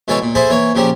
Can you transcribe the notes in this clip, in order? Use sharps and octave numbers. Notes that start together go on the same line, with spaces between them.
B2 E3 G#3 A4 C#5
A#2
E4 G#4 A4 C5 E5
E3 A#3 C#5
A#2 C#3 F3 G4 A#4